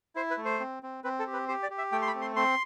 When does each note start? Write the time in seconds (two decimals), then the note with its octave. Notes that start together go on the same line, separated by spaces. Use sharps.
0.16 E4 C5
0.31 B4
0.38 A3
0.45 C5
0.60 C4
0.83 C4
1.04 C4 B4
1.19 A4
1.27 G4
1.33 B4
1.48 G4 C5
1.63 D5
1.70 G4
1.78 E5
1.92 A3 G5
2.02 C6
2.07 B5
2.15 C4
2.21 C6
2.36 C4 C6